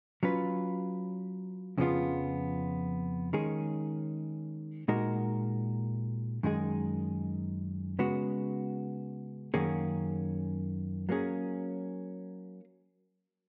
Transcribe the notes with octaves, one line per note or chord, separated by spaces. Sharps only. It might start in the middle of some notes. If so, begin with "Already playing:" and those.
F#3 C#4 F4 B4
F2 C#3 F3 B3 F4
D#3 G#3 C#4 G#4
A#2 G#3 D#4 F#4 A#4
F#2 D#3 G#3 D#4 G#4
C#3 G#3 B3 F#4
F#2 D#3 A#3 C#4 G#4
F#3 A#3 C#4 G#4